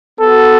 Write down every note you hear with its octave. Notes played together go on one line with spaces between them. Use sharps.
B3 F#4 A4